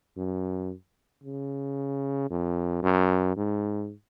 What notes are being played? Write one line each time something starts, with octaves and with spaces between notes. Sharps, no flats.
F#2
C#3
F2
F#2
G#2